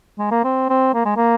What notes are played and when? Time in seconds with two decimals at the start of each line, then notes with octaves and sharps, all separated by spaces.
0.18 G#3
0.31 A#3
0.44 C4
0.70 C4
0.94 A#3
1.05 G#3
1.16 A#3